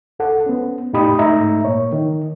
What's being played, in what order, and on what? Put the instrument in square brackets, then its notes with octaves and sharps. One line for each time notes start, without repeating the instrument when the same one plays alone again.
[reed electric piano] C2 A4 F#5
B3 C#4
E2 A2 D#4 G4 B5 D#6
G#2 A3 D#4 E5 A#5
A#2 A#3 C#5
D#3